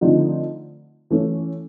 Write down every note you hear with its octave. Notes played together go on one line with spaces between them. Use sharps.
D3 F3 A3 C4 D#4
E3 A3 C#4